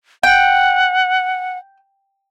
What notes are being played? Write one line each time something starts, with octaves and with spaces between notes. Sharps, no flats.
F#5 G5